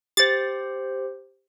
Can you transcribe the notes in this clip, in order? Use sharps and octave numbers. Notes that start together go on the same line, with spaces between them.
G4 C5 A6